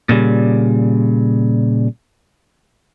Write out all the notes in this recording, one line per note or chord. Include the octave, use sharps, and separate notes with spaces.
A#2 C#3 G3